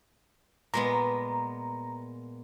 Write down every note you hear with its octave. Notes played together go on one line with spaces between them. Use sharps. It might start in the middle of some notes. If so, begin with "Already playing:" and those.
A#2 G#3 B3 A#5